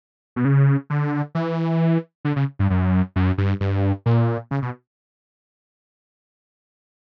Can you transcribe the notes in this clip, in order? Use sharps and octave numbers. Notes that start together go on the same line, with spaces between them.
B2
C#3
D3
E3
D3
C#3
G2
F#2
F#2
G2
G2
A#2
C#3
B2